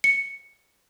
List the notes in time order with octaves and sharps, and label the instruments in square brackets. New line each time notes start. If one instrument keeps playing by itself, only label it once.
[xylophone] C#7